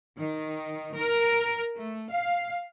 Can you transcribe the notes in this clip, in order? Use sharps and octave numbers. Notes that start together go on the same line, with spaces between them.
D#3
A#4
A3
F5